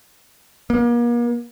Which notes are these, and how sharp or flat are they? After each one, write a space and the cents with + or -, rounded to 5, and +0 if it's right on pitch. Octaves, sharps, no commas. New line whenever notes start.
A#3 +40